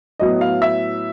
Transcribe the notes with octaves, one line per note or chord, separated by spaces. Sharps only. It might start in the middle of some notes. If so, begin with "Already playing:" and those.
A2 F#3 B3 D#5
F5
E5